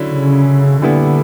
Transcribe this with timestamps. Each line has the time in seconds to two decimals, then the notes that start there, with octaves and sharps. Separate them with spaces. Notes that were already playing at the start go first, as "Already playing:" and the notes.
Already playing: D3 F#3 C#4 E4
0.09 C#3
0.82 A#2 D3 G3 B3 E4